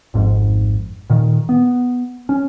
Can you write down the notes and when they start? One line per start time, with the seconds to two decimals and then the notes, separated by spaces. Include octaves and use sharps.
0.14 G#1 F2 G#2
1.10 A#2 D#3
1.49 B3
2.29 C#4